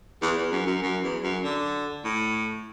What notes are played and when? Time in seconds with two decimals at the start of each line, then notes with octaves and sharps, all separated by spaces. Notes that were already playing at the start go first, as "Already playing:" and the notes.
0.22 E2
0.37 E2
0.52 F#2
0.67 F#2
0.83 F#2
1.03 E2
1.24 F#2
1.44 D3
2.05 A2